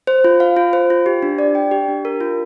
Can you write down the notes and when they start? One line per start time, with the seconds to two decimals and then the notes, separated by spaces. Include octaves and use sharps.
0.07 C5
0.24 F4
0.40 F5
0.57 F4
0.73 C5
0.90 F4
1.06 G4
1.22 D4
1.39 D5
1.55 G5
1.71 G4
1.88 D4
2.05 A#4
2.21 F4